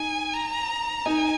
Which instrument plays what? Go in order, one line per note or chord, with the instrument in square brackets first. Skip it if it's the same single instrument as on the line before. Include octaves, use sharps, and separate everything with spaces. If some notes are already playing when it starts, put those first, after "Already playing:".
Already playing: [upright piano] D#4 [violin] G#5
[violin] A#5
[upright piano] D#4 [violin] G#5